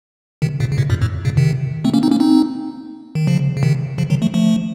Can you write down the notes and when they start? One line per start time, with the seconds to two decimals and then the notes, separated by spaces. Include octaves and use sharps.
0.42 C3 D#3
0.60 A#2 C#3
0.72 C#3
0.78 A2 C3
0.90 F#2 A#2
1.02 F2 A2
1.25 A#2 C#3
1.37 C3 D#3
1.84 A3 C4
1.94 A#3 C#4
2.03 C4 D#4
2.11 A#3 C#4
2.20 C4 D#4
3.15 D#3
3.27 C#3 F3
3.57 C#3
3.63 C3 D#3
3.98 C#3 F3
4.10 D#3 F#3
4.22 F3 A3
4.34 F3 A3